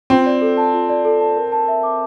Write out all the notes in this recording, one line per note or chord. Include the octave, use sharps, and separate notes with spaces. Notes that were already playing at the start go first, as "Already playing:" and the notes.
C4 F4
D5
A4
A5
F4
D5
A4
A5
A#4
A5
E5
D6